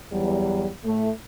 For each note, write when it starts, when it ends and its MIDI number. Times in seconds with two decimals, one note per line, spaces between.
0.12 0.68 40
0.12 0.68 54
0.12 0.68 55
0.85 1.10 45
0.85 1.10 57